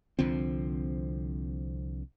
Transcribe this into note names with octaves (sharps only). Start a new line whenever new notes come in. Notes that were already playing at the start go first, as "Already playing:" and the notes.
C2 D3 F3 C4